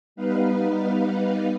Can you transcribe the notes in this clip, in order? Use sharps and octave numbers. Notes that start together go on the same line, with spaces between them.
G3 B3 D#4 B4 F5